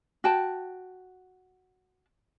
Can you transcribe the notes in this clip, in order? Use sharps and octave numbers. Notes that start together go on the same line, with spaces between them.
F#4 G5 A5